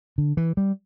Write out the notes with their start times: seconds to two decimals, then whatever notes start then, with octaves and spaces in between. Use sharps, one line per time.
0.18 D3
0.37 E3
0.57 G3